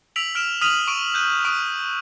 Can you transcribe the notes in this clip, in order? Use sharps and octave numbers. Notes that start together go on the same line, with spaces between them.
E6 B6 D7 F7 F#7
F6 D7 E7
D#6 F6 B6 D#7 F7 F#7
C#6 D7 D#7
F#6 G6 D#7
C#6 D#6 D7